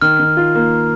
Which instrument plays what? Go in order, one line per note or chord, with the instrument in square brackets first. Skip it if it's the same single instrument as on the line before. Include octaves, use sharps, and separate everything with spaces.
[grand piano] D#3 [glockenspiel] F6
[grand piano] D#3
F4
A#3